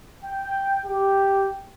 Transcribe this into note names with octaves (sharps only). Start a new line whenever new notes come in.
G5
G4